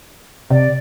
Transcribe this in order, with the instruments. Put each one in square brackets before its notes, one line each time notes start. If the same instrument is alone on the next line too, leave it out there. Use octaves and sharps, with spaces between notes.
[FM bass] C3 [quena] D5